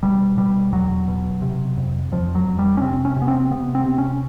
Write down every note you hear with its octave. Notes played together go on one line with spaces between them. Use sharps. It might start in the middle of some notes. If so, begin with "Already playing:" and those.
B2 G3
B2 G3
E2 F#3
B2
C3
F2
F2 F3
F#3
F2
G3
C#4
C3 C4
C#4
C3
B3
C4
C3 B3
C4
C3
C#4